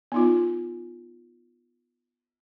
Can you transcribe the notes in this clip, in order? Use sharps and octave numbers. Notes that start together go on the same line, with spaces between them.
B3 D#4 F4